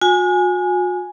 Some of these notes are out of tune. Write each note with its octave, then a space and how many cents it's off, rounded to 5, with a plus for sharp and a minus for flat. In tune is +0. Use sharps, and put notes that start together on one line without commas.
F#4 -45 G#5 +0